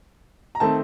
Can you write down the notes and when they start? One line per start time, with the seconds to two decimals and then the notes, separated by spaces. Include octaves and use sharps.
0.55 A#5
0.60 D#3 A3 C4 A5